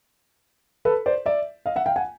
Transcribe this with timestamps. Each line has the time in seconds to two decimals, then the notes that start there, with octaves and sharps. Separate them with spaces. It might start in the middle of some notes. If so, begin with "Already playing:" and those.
0.85 A4 B4
1.06 C5 D5
1.26 D5 E5
1.66 D#5 F5
1.76 E5 F#5
1.86 F5 G5
1.96 F#5 G#5